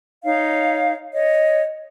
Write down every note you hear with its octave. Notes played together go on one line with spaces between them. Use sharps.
D#4 C#5 F5
C#5 D#5